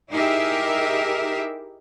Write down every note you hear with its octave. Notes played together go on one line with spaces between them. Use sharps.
D#4 E4 G4 G#4 A#4 E5